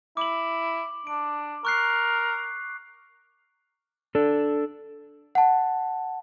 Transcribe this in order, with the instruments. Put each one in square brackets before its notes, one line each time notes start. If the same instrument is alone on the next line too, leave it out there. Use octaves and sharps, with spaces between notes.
[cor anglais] E4 [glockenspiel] D6 F#7
[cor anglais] D4 [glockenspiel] D7
[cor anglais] A#4 [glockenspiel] C#6 F#6 C7
[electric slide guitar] D4 A4
[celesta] F#5 A5